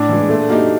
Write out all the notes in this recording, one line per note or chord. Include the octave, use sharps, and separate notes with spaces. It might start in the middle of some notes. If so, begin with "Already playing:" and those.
Already playing: A2 D4
E3 G#3
A#2 A3
F#3 A#3 D#4 G4